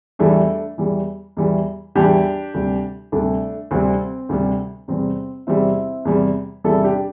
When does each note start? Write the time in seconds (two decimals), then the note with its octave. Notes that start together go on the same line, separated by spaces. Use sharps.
0.19 E2 E3 G3 A3 D4
0.78 E2 E3 G3
1.37 E2 E3 G3
1.95 E2 E3 G3 D4 G4
2.54 D2 C3 G3
3.12 D2 C3 G3 A3 D4
3.71 D2 C3 G3 C4
4.29 D2 C3 G3
4.88 E2 C3 G3 C4
5.47 E2 C3 G3 C4 E4
6.05 E2 C3 G3
6.64 E2 C3 G3 E4 A4
6.84 D4 G4